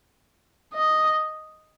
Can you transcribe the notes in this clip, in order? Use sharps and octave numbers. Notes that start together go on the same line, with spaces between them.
D#5